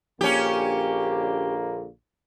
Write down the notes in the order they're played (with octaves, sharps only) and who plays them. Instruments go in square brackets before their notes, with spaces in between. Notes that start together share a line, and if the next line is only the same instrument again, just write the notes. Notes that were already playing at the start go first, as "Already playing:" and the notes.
[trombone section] A#1 D3 A#3 [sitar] C#4 G4